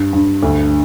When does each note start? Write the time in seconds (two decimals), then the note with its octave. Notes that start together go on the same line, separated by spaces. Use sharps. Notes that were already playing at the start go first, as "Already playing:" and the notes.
Already playing: G2
0.13 G2
0.43 D2